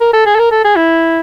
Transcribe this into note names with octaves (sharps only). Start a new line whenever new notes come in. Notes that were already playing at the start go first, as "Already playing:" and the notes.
A#4
A4
G#4
A4
A#4
A4
G#4
E4